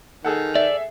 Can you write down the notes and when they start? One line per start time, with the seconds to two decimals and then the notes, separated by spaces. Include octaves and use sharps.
0.25 D#3 G#4 A4 F#5
0.55 D5 E5